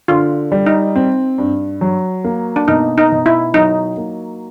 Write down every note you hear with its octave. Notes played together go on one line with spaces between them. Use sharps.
D3 F4
G3
D#4
C4
G2
F#3
A#3
D4
B2 D#4
D#4
B2
E4
F#3 D#4
A#3